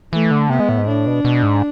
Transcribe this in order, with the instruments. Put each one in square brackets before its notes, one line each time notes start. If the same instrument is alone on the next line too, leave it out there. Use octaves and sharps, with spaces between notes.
[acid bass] E3 [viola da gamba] A3
[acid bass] D3
[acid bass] C3 [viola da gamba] B3
[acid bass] G#3
A2
G#2
[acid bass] A2 [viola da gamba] D4
[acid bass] B2
B2
G#2